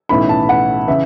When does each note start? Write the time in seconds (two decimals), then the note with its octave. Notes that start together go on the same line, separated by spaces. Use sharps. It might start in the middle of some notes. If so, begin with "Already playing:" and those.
0.09 B1 A2 E3 C#4 E4 B5
0.29 A5
0.49 F#5
0.87 C#3 E3 E5